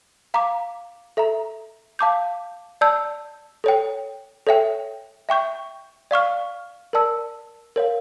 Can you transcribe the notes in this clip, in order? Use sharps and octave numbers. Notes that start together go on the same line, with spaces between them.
F5 A#5 D6
A4 E5 A#5
F5 A5 D6 G6
D5 A5 E6 G6
A4 C#5 G5
A4 C#5 E5 G5
E5 G5 C#6 G6
D5 F5 C#6 F6
A#4 D5 A5 E6
A#4 C#5 F5